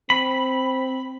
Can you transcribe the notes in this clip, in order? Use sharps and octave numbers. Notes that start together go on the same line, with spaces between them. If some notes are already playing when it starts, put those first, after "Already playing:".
C4 B5